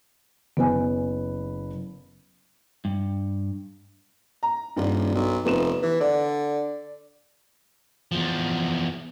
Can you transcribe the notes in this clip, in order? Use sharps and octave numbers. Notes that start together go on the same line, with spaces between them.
F#1 B3 B4 G#5
G2
A#5
D#1 G2
B1
F1 B3 B4 E7
E3
D3 D5
E2 F3